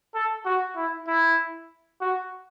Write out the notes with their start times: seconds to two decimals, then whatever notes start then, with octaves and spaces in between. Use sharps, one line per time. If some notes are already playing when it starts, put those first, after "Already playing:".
0.14 A4
0.45 F#4
0.76 E4
1.08 E4
2.01 F#4